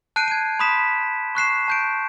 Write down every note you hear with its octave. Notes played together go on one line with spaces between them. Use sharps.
A5 F#6 G6 C7 D7 D#7
G#6 D#7
B5 C6 D#6 B6 E7
C#6 F#6 C7 E7
A5 G6 D7